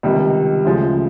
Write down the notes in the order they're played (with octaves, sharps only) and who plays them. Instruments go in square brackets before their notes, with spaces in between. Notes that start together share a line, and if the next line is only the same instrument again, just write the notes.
[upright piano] C#2 C3 D#3 G3
D2 C#3 F3 G#3